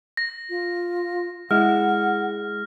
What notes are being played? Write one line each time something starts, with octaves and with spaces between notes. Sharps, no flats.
A#6
F4
G#3 E4 F#5 F6